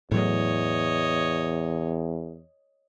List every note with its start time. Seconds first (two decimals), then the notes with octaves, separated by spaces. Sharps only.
0.11 E2 A2 F#3 C#5 D#5